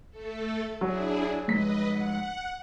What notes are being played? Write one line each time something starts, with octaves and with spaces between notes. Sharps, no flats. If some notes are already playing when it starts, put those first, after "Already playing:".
A3 A4
F#3 D4 E4 G#4
F1 G#2 B4 D#5 B6
F#5